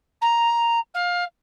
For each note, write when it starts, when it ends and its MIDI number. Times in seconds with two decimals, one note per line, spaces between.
0.21 0.79 82
0.94 1.24 77